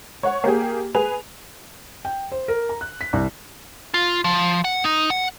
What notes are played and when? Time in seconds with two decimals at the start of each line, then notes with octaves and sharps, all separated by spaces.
0.23 C#5 F#5
0.44 A#3 G4 G#4
0.95 G#4 B4 G#5 F7
2.05 G5
2.32 C5
2.48 A#4
2.69 A#5
2.81 F#6
3.01 B6
3.13 C2
3.94 F4
4.24 F3
4.64 F#5
4.84 D#4
5.10 F#5